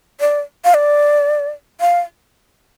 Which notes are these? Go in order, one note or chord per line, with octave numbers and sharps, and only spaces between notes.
D5
F5
D5
F5